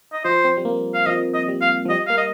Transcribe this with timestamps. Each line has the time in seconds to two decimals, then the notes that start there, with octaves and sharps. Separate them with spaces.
0.13 D#5
0.25 F3 C5
0.44 C4
0.57 G3
0.65 A#3
0.94 F5
1.06 F3 D#5
1.34 D#5
1.48 G3
1.61 F5
1.85 F3
1.89 G3 D#5
2.07 A#3 F5
2.18 D#5